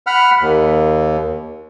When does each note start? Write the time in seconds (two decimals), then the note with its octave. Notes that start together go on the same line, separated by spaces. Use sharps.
0.07 F#5 B5 F6
0.41 D#2